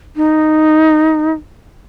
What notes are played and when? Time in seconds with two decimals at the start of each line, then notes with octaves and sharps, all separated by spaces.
0.16 D#4